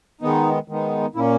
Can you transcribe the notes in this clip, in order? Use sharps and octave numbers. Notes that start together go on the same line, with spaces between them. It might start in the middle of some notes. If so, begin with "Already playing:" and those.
D#3 G#3 B3 D#4
D#3 G#3 B3 D#4
A#2 A#3 C#4 E4